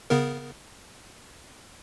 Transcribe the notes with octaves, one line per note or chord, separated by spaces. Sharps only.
C#3 B3 A#4